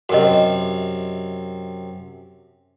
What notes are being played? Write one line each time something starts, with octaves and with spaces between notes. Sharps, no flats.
F#2 C3 F#4 A#4 D#5